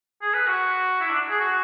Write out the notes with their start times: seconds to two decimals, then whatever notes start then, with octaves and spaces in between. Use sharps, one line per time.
0.22 G#4
0.34 B4
0.47 F#4
1.00 E4
1.10 D4
1.30 G#4
1.40 F#4